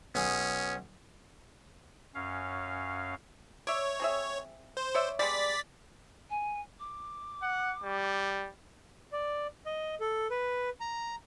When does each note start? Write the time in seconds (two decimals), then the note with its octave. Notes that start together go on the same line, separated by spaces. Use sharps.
0.15 B1 C#4 G#4
2.15 F#2 C#4 F5
3.67 C#5 D5 E5
4.00 C4 G#4 E5
4.77 C5
4.95 C#5 D5 E5
5.19 G3 G#3 B3 D5 A6 B6
6.30 G#5
6.79 D6
7.42 F#5
7.83 G3
9.12 D5
9.66 D#5
10.00 A4
10.31 B4
10.81 A#5